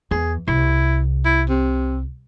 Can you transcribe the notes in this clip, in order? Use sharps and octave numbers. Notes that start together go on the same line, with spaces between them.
E2 G#4
C2 E4
E4
C3